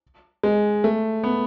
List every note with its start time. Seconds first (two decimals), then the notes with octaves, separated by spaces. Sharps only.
0.43 G#3
0.84 A3
1.23 B3